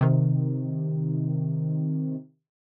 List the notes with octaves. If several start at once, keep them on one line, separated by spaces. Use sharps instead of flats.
C3 D#3